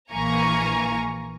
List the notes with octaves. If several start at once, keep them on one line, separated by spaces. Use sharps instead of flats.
A#1 E3 A#3 G#5 A#5 C#6